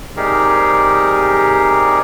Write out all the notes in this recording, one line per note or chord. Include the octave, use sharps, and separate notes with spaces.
C3 G3 D#4 G4 G#4 A#4